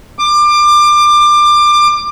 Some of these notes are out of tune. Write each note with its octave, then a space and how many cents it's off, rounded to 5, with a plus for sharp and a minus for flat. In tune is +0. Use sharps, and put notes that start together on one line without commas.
D6 +25